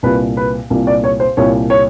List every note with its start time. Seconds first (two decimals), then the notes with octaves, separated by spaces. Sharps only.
0.03 C2 A#2 B4
0.37 B4
0.70 C2 A#2
0.87 D5
1.04 C#5
1.20 C5
1.37 C2 A#2 C#5
1.70 C#5